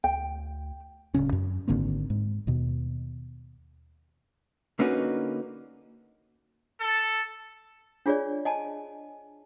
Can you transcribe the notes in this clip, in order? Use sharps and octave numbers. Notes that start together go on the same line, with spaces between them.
D2 G5
D1 B1 C#3 C#4
F#2
G#1 D3 A#3 C4
G#2
D#2 B2
D3 A#3 C#4 D#4 F#4 B4
A4
D4 F4 G#4 C#5 D5
D#5 G#5 A5